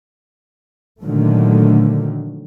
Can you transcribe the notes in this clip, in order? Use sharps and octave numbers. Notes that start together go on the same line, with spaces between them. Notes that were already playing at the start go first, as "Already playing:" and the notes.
A#2 D3 D#3 F3 F#3 A3